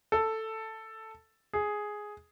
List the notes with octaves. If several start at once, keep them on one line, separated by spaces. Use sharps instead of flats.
A4
G#4